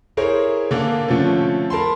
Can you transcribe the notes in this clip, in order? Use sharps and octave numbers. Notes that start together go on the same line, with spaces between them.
E4 G#4 A#4 C5 C#5
D3 A#3 D4
D3 F3 A3 C4 C#4
A#4 A5 B5 C6